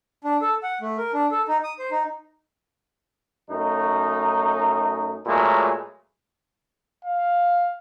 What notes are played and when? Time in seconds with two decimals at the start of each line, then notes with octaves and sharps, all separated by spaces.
0.24 D4
0.41 A4
0.63 F#5
0.81 A3
0.98 A#4
1.13 D4
1.31 A4
1.48 D#4
1.64 D#6
1.79 C5
1.91 D#4
3.50 F#2 A3 D#4
5.26 A#2 F#3 G#3 A3 B4
7.05 F5